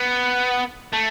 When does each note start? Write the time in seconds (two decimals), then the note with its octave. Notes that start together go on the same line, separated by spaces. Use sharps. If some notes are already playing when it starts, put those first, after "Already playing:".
Already playing: B3
0.93 A3